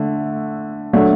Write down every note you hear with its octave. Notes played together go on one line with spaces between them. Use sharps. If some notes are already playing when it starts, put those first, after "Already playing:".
Already playing: D3 A3
F#3 A3 D4